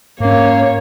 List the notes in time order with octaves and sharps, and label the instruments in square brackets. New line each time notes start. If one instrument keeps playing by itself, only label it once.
[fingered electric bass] G#2 C#4 [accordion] A#3 [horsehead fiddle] C#5